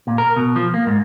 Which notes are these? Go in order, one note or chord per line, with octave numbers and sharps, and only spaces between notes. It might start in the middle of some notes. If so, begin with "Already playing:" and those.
A#2
A#4
B2
F3
A#3
G#2